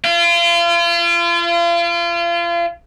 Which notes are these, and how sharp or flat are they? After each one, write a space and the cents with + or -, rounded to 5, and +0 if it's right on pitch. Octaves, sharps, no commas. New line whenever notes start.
F4 -35